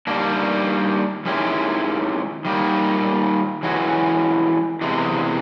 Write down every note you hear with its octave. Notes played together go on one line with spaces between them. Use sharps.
D#3 G3 A#3 D4
D#3 G#3 C#4 E4 G4
D#3 G3 A#3
E3 G#3 C#4 F#4
E2 C3 E3 G#3